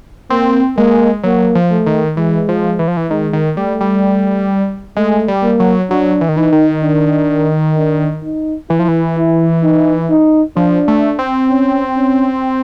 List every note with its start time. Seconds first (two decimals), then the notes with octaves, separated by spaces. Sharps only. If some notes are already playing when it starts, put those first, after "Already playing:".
0.30 A#3 C4
0.77 G#3 A#3
1.23 F#3 A#3
1.55 F3
1.70 A3
1.86 D#3
2.17 E3 G#3
2.49 F3
2.79 E3
2.88 F3
2.97 E3
3.10 D#3 G#3
3.33 D#3
3.57 G3 A3
3.81 G3
4.96 G#3 A3
5.28 G3
5.43 A#3
5.60 F#3
5.90 F#3 D4
6.21 E3
6.29 D#3
6.36 E3 D#4
6.52 D#3
6.83 D4
7.77 D4
8.23 D#4
8.70 E3 E4
8.79 F3
8.88 E3
9.17 E4
9.63 D#4
10.10 D#4
10.56 F3 D4
10.88 A3
11.19 C4
11.50 C#4
11.97 C#4